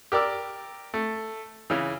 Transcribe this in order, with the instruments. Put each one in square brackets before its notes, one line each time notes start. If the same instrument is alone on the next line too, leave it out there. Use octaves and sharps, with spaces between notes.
[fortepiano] G4 A#4 D5 D6 E6
A3
C#3 E3